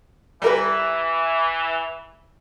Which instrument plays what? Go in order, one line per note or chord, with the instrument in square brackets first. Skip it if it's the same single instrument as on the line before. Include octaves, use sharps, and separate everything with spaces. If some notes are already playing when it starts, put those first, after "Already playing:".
[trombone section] E3 [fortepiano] G3 A#4 B4